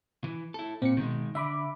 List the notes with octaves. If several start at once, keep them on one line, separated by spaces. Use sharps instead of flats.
E3
E4 A4
A#2 C4 C#7
B2 D#3 G#3
D3 E5 B5 D6